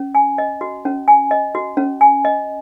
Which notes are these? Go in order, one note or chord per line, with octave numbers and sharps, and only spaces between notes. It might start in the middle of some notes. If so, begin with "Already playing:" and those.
Already playing: C#4
G#5
D#5
F#4
C#4
G#5
D#5
F#4
C#4
G#5
D#5